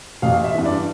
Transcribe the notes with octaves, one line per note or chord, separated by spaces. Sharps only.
A1 F5
E5
G2 E3
D5